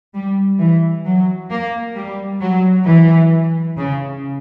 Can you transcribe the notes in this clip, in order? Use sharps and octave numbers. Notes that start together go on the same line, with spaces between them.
G3
E3
F#3
A#3
G3
F#3
E3
C#3